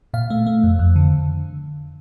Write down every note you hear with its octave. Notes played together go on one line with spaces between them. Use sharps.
A#2 F5
A3
A3
F2
F2
D3